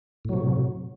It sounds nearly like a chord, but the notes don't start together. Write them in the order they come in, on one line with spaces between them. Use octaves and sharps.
A2 F#3 C3